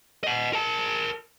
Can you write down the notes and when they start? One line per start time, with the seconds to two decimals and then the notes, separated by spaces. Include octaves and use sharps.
0.24 D#5 F#5
0.53 A#4 A5